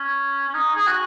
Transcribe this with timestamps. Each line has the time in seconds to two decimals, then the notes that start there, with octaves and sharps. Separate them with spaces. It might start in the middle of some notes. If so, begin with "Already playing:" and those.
Already playing: C#4
0.49 C#4
0.54 D#4
0.76 G#4
0.87 F#4